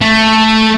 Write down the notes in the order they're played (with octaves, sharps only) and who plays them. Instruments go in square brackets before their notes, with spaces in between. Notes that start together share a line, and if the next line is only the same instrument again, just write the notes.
[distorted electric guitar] A3